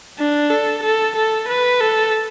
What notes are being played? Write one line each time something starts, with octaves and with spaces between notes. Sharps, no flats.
D4
A4
A4
A4
B4
A4